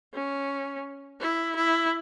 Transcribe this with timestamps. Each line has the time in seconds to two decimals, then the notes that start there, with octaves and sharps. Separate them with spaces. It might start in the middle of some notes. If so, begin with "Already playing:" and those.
0.14 C#4
1.21 E4
1.56 E4